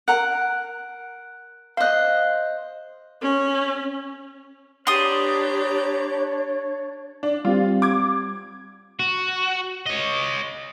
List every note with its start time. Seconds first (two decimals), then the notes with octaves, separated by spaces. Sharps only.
0.08 A#4 F#5 F#6
1.77 C5 D#5 F5 F#6
3.22 C#4
4.87 D4 G4 B4 C#5 A#5 C6 D#6
7.23 D4
7.45 G3 C4 F4 G4
7.82 D6 G#6
8.99 F#4
9.86 C#5 D#5